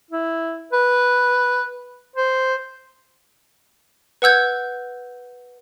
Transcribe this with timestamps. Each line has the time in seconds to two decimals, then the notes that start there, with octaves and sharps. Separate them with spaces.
0.11 E4
0.73 B4
2.16 C5
4.22 B4 F#5 E6 G6 G#6